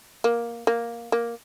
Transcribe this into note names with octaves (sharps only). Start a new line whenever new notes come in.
A#3
A#3
A#3